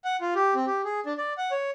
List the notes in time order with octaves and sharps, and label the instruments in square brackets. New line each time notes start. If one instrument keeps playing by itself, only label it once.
[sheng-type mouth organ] F#5
F4
G4
C4
G4
G#4
D4
D5
F#5
C#5